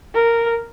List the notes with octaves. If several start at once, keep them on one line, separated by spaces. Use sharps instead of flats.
A#4